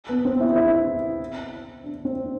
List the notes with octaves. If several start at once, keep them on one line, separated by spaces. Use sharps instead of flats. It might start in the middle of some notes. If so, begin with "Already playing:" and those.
B3
C4
E4
E4
D4
C4